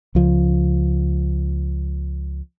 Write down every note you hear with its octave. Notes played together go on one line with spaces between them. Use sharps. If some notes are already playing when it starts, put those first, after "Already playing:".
C#2 F3